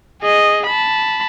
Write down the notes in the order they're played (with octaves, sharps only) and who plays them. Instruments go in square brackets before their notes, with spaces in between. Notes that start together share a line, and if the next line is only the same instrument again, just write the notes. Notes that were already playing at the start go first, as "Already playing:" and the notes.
[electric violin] G#4 D#5
A5 B5